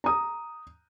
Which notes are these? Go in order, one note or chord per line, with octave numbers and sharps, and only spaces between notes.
A#5 D#6